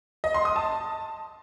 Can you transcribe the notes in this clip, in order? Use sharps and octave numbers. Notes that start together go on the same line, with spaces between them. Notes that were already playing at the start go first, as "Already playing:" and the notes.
D#5
C6
D#6
A5